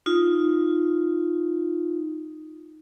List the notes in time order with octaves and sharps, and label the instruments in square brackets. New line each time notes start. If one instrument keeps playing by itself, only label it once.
[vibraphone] D#4 F4